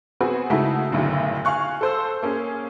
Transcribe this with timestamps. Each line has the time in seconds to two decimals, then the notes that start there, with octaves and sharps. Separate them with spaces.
0.21 B3 C4 F#4 G#4 B4
0.50 C#3 G#3 A3 D#4 E4 F#4
0.92 F#1 B1 A2 D3
1.45 F5 G#5 C#6 F#6
1.81 A4 C5 E6
2.23 A#3 C#4 G#4